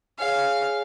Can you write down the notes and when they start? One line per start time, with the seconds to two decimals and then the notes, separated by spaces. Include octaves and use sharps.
0.19 G#4 C#5 F5 G#5